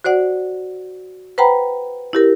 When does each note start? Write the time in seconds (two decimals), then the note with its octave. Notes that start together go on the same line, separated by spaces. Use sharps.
0.04 F#4 C5 D5 F#5
1.38 B4 C5 F#5 G5 A#5 B5
2.13 E4 G4 A#4